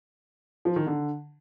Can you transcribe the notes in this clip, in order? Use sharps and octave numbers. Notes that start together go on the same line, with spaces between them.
F3
D#3
D3